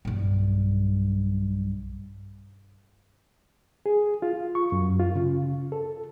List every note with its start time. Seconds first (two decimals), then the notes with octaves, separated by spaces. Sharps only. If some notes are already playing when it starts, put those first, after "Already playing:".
0.05 B1 G2
3.86 G#4
4.22 F4
4.55 C#6
4.72 F#2
5.00 F4
5.16 C#3
5.72 A4